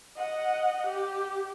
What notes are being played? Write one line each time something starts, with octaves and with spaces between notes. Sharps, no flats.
D#5 F#5
G4